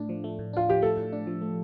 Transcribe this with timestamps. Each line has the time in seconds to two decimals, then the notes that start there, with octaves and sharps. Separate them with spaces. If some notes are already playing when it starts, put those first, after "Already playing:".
Already playing: A2 A3 D4
0.09 F3
0.24 A3
0.39 A2
0.53 D4 F4
0.68 F3 G4
0.82 A3 A4
0.97 A2
1.13 D4
1.27 F3
1.41 A3